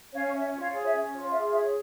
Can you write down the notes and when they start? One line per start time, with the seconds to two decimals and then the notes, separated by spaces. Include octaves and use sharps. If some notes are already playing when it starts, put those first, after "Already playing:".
0.12 C#4 C#5 F5
0.33 C#4 E5
0.52 F4
0.59 C#5 F5
0.73 G#4 C#5
0.86 E5
0.92 C#4
1.12 F4 C#5
1.24 C#5
1.31 G#4 E5
1.51 C#5 E5